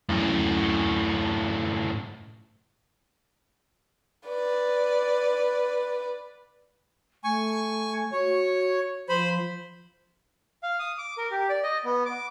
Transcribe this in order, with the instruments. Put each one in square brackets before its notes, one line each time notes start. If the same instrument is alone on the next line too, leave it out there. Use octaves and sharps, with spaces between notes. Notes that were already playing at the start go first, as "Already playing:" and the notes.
[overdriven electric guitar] F#2 A2
[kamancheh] B4 D5
[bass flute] A3 [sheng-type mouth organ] G#5 C#6
[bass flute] F#4 [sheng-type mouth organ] C#5
[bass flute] F3 [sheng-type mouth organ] C5 B5
[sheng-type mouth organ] F5
D#6
D6
A#4
G4
D5
D#5
B3
D6